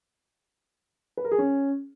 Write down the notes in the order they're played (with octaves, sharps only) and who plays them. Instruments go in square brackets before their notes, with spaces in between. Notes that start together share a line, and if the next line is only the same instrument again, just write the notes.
[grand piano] B4
A#4
G#4
C#4